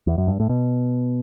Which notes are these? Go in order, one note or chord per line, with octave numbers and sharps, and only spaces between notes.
E2
F#2
G2
A2
B2